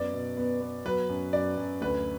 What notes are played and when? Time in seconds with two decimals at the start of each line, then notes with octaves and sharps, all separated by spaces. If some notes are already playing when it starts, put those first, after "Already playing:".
Already playing: F#2 B3 D5
0.13 B2
0.37 B3
0.61 B3
0.85 F#3 B4
1.09 F#2
1.33 F#2 D5
1.57 F#2
1.81 D2 B4